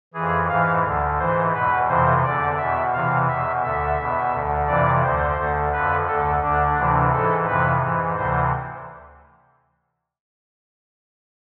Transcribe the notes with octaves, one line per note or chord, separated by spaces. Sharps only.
F2 E3 G#4
G#2 E3 F5
D2 D3
G#2 E3 C5
E2 B2 B4
F2 C3 E3 C5
E2 D3 D5
E2 B2 E5
E2 C3 E3 F5
E2 B2 E5
D2 D3 E5
E2 B2
D2 D3
F2 C3 E3 D5
D2 D3 C5
D2 D3
F2 D3 B4
D2 D3 A4
D2 D3 D4
D2 C3 E3
G#2 E3 A4
F2 C3 E3 B4
G#2 E3
D2 C3 E3 C5